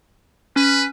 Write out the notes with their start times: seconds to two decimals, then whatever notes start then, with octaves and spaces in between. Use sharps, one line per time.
0.56 C#4 B4